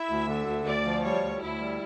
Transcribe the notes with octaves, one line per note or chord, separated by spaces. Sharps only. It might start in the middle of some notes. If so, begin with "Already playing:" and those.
Already playing: E4 E5
D2
D3
D2
D2 D5
F3
G3 C#5
D2
D2 E4
G3